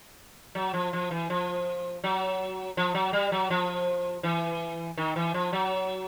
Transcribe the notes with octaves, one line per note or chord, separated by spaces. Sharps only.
F#3
F3
F3
E3
F3
F#3
F3
F#3
G3
F#3
F3
E3
D#3
E3
F3
F#3